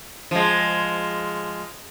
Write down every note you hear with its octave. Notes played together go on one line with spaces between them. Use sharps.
F3 G#3